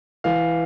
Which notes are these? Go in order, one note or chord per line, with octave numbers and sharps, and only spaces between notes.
E3 F5